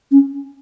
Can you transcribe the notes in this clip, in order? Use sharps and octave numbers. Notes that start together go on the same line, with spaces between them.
C#4